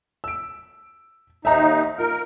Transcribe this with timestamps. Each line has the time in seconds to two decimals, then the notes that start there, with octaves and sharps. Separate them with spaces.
0.24 E6 D7
1.45 D#2 D#4 E5 A#5
1.98 F4 A#4